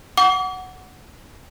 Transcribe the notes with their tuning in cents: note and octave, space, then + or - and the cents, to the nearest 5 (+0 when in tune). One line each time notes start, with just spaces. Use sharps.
F#5 +0 D6 -40